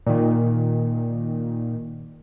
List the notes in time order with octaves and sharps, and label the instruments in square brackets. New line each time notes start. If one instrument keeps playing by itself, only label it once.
[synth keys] A#2 D#3